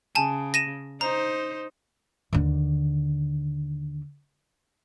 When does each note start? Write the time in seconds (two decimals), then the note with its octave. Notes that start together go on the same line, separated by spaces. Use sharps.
0.15 C#3 G#5 A5
0.54 A#6 D#7 E7
1.01 D#4 C5 A#5
2.33 D#2 D3